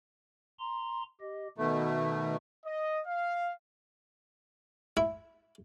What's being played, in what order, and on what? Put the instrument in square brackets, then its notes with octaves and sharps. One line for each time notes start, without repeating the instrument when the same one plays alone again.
[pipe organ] A#5 C6
G4 D#5
[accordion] B2 A3 [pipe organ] D#3 D#4
[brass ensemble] D#5
F5
[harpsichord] E4